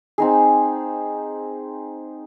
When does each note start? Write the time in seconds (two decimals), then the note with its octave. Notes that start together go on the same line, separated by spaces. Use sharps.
0.18 C4 D#4 G#4